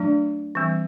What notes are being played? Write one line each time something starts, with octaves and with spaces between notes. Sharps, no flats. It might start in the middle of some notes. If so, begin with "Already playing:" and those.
Already playing: F#3 A3 D4
E3 G3 C4